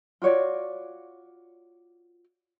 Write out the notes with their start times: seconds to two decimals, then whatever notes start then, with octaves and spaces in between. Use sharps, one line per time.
0.22 F4 F#4 C#5 D5